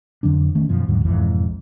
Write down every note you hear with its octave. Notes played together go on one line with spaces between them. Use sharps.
F2 D3 F#3 D4
D#3 A3 C#4
F#2 B2 F3
D#2 G#2 D3 F#3
B1 F2 G#2 E3